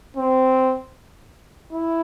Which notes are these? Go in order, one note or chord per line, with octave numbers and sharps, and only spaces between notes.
C4
E4